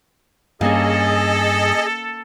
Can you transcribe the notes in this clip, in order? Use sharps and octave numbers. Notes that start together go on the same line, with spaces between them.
G2 A#3 C#4 G#4 A4 D#5